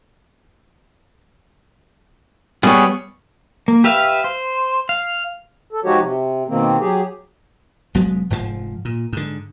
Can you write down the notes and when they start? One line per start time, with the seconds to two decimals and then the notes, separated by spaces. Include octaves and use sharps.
2.63 G3 B3 G#4 C#5
3.68 A#3
3.84 G4 B4 E5 F5
4.24 C5
4.89 F5
5.73 A4
5.85 F3 G#3 D#4 F#4 G4 C#5
6.01 C3
6.49 B2 D#3 A#3 C4
6.81 F#3 G4 G#4
7.95 F1 F#3 G#3 B3
8.30 F1 G#2 B2 F3
8.85 A#2
9.13 G#2 D3